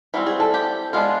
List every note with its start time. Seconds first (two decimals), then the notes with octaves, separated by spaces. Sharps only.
0.14 E3 G3 C4 F#4
0.26 G#4
0.40 A4
0.54 G4
0.93 G#3 B3 D4 F4